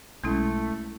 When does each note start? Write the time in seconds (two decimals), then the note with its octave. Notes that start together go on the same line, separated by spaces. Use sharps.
0.24 B1 G#3 A3 C#4 E4